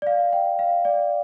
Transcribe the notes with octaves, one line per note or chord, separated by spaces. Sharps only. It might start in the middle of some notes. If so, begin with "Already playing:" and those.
D5
F5
G5
F5
D5